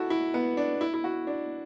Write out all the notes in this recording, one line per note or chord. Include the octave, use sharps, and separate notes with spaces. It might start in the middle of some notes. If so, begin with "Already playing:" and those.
Already playing: E4 F#4 A4
E4
B3
D4
E4
E4
F#4
D4